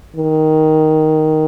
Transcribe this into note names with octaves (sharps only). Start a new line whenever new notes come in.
D#3